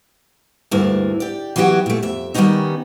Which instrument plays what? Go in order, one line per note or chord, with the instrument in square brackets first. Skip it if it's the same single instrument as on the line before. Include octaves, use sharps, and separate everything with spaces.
[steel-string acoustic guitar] D2 G2 A#3 D4 E4
G4 D5
E3 F#3 B3 F#4 G4
A#2 A3
F2 E5
D#3 G3 A#3 B3 C#4 D#4